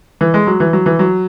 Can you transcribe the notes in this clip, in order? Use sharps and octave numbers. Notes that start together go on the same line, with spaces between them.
E3
G#3
F#3
E3
F#3
E3
F#3